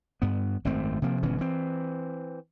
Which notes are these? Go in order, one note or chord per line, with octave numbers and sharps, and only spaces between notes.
G2 B3
G#1 F#2 A3 C4
C3 F3 A#3
G1 B2 E3 C#4
E3 C4